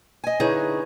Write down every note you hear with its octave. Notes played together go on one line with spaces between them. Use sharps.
D#5 G#5
D3 D#4 E4 G#4 B4 C#5